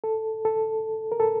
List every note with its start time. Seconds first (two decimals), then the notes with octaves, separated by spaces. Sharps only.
0.04 A4
0.45 A4
1.12 A#4
1.20 A4